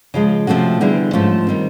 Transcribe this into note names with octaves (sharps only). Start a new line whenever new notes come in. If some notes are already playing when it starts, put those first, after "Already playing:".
C#3 F3 G#3
C3 F3 A3 C#4 F#4
D3 G3 B3 E4 G#4
G#2 F3 A3 C#4 F4
D#3 G3 C4